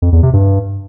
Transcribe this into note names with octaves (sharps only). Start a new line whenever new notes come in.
F2
E2
C3
G2